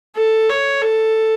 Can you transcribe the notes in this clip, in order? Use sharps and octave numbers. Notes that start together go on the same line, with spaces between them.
A4
C#5
A4